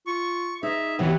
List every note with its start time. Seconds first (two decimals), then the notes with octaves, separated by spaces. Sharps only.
0.07 F4 C#6
0.63 D#4 G#4 E5
0.99 C3 E3 F#3 B3 G4